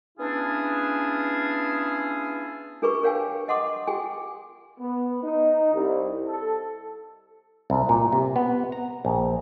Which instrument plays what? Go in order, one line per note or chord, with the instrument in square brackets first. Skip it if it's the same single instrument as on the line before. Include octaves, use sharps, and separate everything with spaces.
[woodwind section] B3 C#4 D4 E4 F4 G#4
[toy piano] D4 G4 G#4 A#4 B4 C#6
A#4 C#5 F5 G5 G#5
D#5 F#5 C6 D6 D#6
G4 G#4 G5 G#5
[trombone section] B3
D#4
C2
A4
[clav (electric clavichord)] C2
A#2
C3
B3
A#5
A#1